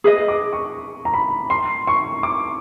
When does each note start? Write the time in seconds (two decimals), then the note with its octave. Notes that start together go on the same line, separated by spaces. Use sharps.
0.04 G#4 B4 D#5
0.28 D6
0.53 C#6
1.05 A#5
1.14 B5
1.50 C6
1.87 C#6
2.23 D6